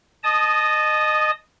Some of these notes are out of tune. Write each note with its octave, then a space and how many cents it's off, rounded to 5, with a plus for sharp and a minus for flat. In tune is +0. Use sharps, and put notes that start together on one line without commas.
D#5 -20 A5 -20 D#6 +0